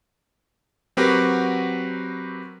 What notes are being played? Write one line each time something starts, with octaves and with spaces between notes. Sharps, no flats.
F#3 C4 F#4 G4 A#4 B4